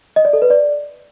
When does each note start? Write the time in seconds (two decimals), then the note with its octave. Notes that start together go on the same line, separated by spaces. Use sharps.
0.16 D#5
0.25 D5
0.33 A4
0.42 B4
0.50 D5